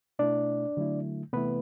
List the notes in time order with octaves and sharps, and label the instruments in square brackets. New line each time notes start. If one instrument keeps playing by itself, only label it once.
[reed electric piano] B2 A3 D4 E4 D5
D3 F#3 A3 E4
C3 E3 A3 B3 E4 B4